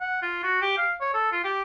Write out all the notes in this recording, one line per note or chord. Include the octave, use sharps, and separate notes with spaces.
F#5
F4
F#4
G4
F5
C#5
A4
F4
G4